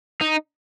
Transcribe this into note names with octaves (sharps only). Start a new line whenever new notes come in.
D#4